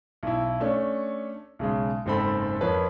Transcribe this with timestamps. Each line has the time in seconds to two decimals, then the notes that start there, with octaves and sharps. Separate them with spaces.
0.23 B1 E4
0.60 A3 C#4 D4
1.59 B1 C#3 G#3
2.06 F#1 G#2 C4 A4 B5
2.61 F2 F3 A#3 B4 C#5